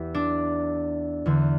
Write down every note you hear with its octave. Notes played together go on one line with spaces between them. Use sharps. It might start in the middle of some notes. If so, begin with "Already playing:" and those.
Already playing: E2 E4 G4
D4
E2 D3